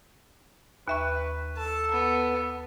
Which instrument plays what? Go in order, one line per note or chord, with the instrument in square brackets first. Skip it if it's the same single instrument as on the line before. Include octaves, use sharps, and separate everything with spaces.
[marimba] D#2 E5 C#6 [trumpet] B4
[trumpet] A4 [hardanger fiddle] A5
[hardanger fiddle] B3